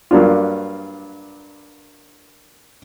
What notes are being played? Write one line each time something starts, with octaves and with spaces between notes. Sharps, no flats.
G2 F#3 A#3 D4 F4